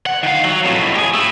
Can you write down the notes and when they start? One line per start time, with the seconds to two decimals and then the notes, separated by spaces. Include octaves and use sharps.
0.06 F#5
0.23 D#3 F5
0.45 F#3
0.64 F2 A2
0.95 G4 G#4
1.14 A3 E4